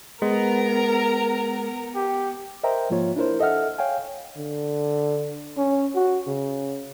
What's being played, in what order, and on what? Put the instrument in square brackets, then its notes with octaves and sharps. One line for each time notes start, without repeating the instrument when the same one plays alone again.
[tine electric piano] G#3 [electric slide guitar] B3 [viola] A#4 A#5
[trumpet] G4
[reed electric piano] A#4 C5 D#5 E5 G5 A#5
G#2 F3 A#3 F4 C#5
D4 E4 A#4 C5
A4 D#5 E5 F#5 F6
C#5 F5 G5 G#5
[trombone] D3
C#4
F#4
C#3